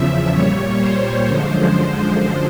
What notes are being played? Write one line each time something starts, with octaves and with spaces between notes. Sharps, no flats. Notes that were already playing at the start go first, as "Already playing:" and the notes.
Already playing: E2 C#3 F3 E5
A#2 G3 C#5
C5
F#2 D3 F3 G#3